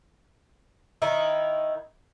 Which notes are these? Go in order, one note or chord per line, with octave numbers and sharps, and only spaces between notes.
D#3 D#4 E4